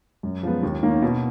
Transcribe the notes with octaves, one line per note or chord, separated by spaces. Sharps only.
F#2
F3 G#3 B3
D#2
D#3 A#3 C#4
B2